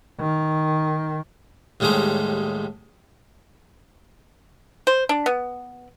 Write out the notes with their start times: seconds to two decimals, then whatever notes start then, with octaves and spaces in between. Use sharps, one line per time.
0.20 D#3
1.80 D#2 A2 G3 G#3 D#4 C5
4.87 C5
5.09 D4
5.26 B3